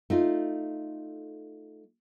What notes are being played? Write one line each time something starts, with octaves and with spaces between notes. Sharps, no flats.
A3 D#4 F4